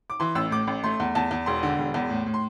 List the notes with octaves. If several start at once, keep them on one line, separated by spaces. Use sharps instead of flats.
D6
E3 C6
A1 E6
A2 D6
A1
A3 C6
E2
E2 A5
E2
E1 C6
D3
E1
E2
A2
A2
C6